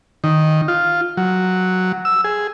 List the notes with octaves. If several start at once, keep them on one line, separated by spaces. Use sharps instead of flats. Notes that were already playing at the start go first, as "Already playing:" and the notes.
D#3
F4
F#3
E6
G#4